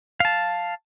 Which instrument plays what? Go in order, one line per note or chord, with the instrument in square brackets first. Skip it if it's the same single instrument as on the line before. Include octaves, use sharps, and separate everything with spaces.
[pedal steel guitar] F5 A5